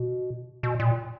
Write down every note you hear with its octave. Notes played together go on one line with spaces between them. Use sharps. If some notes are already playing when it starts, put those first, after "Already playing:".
Already playing: B2
B2
A#2